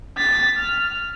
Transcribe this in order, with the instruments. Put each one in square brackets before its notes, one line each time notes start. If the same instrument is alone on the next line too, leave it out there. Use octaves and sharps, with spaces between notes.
[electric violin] A6 B6
F6